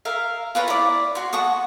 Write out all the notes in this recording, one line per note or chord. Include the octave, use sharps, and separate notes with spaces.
A#4 E5 F5
F4 B4 C#5 A#5
E4 D5
F#4 C6
F#5 A5 C#6 D#6